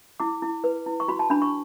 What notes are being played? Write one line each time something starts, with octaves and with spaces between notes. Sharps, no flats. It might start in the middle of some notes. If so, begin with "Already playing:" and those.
E4 D6
E4
B4
E4
C#6
F#4 B5
A5
D4 B5
C#6